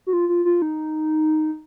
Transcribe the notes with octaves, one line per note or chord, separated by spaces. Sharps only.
F#4
F4
F4
F4
D#4